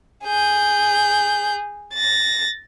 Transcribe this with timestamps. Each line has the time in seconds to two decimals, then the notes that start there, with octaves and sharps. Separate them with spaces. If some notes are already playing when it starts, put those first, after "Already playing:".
0.25 G#4 G6
1.94 A6 A#6